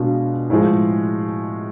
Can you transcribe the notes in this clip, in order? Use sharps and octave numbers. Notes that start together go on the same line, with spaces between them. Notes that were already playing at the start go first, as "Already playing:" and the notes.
Already playing: B2 G#3 D4 F4
A2 F3 G#3